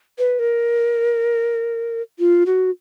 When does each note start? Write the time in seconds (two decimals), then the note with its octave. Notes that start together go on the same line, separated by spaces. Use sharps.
0.19 B4
0.39 A#4
2.19 F4
2.46 F#4